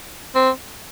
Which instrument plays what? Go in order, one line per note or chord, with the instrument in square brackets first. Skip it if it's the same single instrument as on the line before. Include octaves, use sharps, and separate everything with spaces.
[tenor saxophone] C4